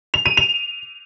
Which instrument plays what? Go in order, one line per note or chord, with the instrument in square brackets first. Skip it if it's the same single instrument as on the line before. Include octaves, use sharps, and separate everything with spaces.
[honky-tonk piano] F7
D#7
F7